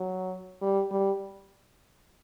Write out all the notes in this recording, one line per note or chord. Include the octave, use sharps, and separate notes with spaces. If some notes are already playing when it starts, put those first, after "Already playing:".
Already playing: F#3
G3
G3